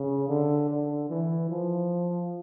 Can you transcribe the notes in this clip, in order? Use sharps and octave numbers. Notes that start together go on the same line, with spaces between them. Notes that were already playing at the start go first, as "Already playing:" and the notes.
Already playing: C#3
D3
D3
E3
F3